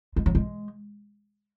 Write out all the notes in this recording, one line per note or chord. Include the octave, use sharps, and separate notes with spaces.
G#3
F#3
G#3